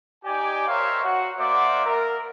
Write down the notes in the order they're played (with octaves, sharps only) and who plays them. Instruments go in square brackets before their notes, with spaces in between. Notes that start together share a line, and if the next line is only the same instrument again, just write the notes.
[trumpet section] D#4 G4 D5 G5 G#5
A#4 C5 C#5 E5 F5
F#4 F#5
A#3 C5 D5 E5 F#5 D6
A#4